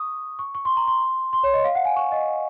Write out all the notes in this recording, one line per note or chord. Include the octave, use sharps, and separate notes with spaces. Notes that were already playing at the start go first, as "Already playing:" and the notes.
Already playing: C#6 D#6
C#6
C#6
C6
A#5
C6
C6
C#5
D#5
F5
F#5
G#5
C#6
D#5